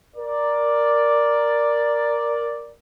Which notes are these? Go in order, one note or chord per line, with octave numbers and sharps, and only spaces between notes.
A#4 D5